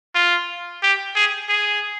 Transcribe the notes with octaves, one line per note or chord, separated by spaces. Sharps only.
F4
G4
G#4
G#4